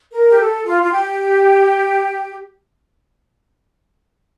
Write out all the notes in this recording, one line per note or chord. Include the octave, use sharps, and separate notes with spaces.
A#4
G4
A4
F4
F4
G4